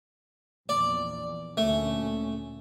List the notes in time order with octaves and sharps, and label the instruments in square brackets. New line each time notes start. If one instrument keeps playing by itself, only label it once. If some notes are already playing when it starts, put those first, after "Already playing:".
[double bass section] A#1 E2 [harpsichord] D5
[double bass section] D2 A#2 C#4 [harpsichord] A3